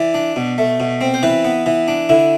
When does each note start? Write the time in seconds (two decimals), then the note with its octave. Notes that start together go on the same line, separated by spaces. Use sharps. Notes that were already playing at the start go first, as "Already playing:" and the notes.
Already playing: E3 D5
0.14 D4
0.36 B2
0.58 A3
0.80 B2
1.01 C4
1.14 C5
1.23 E3 B4
1.45 B3
1.66 E3
1.88 D4
2.09 D3 E4